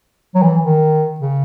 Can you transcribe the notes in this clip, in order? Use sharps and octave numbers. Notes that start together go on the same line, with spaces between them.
F#3
E3
D#3
C#3